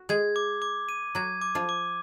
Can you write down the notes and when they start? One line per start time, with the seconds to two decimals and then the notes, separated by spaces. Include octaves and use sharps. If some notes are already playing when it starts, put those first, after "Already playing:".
Already playing: F#4
0.09 G#3 G#4 G#6
0.36 D6
0.62 D6
0.89 D#7
1.15 F#3 F#4 G#6
1.42 D6
1.55 F3 F4
1.69 D6